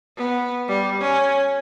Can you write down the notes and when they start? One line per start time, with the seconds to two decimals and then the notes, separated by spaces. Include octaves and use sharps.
0.18 B3
0.68 G3
1.01 C#4